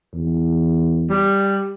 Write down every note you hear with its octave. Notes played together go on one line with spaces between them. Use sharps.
E2
G3